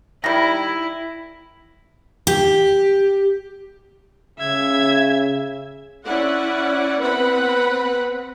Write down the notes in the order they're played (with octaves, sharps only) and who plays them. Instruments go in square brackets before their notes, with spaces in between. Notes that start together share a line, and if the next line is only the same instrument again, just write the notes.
[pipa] D#3 G3 [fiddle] E4 [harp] A#6
[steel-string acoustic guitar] G4
[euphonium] C#3 [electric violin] E5 G#6
[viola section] C#4 E4 D5 F#5
B3 C4 B4 F#5 B5